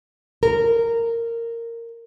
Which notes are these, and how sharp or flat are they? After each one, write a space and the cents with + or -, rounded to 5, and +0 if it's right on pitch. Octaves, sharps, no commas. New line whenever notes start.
A#4 -10